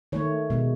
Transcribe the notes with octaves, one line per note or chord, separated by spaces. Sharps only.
D#3 A3 C#5
B2 G#3